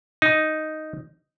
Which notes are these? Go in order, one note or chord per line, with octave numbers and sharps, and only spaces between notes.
D#4